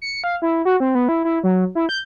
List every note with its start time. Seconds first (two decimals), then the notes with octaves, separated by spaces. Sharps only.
0.02 C#7
0.24 F5
0.42 E4
0.65 F#4
0.80 C4
0.95 B3
1.09 E4
1.25 E4
1.44 F#3
1.75 E4
1.89 G6